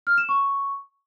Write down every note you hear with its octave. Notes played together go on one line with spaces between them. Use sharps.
F6
E7
C#6